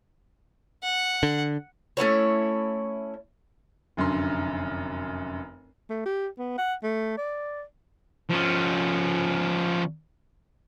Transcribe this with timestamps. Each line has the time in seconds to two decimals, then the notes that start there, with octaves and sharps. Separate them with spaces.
0.83 F#5
1.23 D3
1.97 A3 C#4 E4 C#5
3.97 F1 F#2 D3 C6
5.90 A3
6.05 G4
6.38 B3
6.58 F#5
6.83 A3
7.17 D5
8.30 F3 C#4